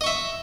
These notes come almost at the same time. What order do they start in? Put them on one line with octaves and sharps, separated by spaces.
D#5 C#6 E5